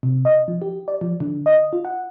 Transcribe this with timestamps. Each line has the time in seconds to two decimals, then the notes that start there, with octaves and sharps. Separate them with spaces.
0.03 C3
0.25 D#5
0.48 F3
0.62 G4
0.88 D5
1.01 F3
1.20 D3
1.46 D#5
1.73 F4
1.85 F#5